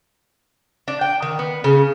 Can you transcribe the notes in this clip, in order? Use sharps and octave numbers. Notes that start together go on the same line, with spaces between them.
D4
G5
D#3
B3
C#3